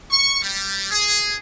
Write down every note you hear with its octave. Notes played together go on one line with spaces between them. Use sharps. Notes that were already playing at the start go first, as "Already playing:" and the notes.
C#6
G3
G#4